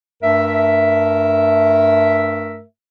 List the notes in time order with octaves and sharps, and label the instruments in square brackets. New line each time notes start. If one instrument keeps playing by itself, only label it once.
[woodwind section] G2 A3 A#4 E5